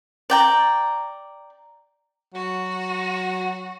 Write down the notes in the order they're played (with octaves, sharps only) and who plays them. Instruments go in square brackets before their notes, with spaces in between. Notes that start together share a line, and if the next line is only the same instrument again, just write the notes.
[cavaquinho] D5 G5 A#5
[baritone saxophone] F#3 [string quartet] F#4